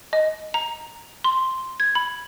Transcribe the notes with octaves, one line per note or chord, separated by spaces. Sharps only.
D#5
A#5
C6
G#6
B5